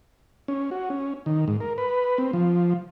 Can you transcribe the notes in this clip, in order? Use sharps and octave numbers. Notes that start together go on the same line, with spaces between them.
C#4
F#4
C#4
D#3
G#2
A#4
B4
C4
F3